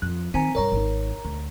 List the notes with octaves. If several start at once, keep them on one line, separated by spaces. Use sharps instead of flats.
F2 F#6
D#3 C4 G#5 A#5
G2 C3 A#4 C#5 A#5
G#1 D#4
D2